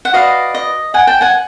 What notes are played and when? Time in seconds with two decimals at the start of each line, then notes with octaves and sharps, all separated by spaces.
0.05 F#5
0.13 F#4 B4 D5 D#5 F5
0.55 D#5
0.94 F#5 G#5
1.07 G5 A5
1.21 F#5 G#5